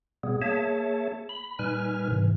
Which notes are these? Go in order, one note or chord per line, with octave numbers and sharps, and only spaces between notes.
B2 G3 B3 G#4
A#3 G#4 C#5 E5 A5
B5
A#2 G3 D#4 B4 G#5 F6
G#2 C3 E3